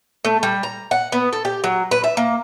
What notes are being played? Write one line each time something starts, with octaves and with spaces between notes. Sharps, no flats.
A3
G3
A#5
F#5
B3
A4
G4
F#3
B4
E5
A#3